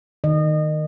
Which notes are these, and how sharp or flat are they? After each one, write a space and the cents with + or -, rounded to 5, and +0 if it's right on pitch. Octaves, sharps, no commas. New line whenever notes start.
D#3 -10 D#5 -30